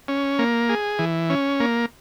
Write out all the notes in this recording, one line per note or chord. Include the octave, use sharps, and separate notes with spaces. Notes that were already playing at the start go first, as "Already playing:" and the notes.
C#4
A#3
G#4
E3
C#4
A#3